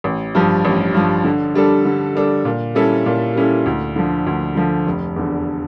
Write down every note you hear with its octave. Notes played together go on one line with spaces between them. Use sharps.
A1
G2 F3
A1
G2 F3
D3
G3 D4 A4
D3
G3 D4 A4
A#2
G3 C#4 E4 A4
A#2
G3 C#4 E4 A4
D2
D3 F3
D2
D3 F3
F1
E2 D3